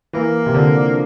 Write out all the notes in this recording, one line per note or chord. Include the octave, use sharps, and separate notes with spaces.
E3 A#3
C3
D3 F3